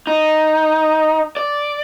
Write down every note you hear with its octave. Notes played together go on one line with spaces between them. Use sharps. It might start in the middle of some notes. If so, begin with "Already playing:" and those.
D#4
D5